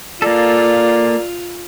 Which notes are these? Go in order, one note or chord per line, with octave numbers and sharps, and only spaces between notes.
A#3 F4 A4 D5